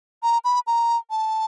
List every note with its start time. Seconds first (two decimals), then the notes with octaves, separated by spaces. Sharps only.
0.23 A#5
0.44 B5
0.67 A#5
1.10 A5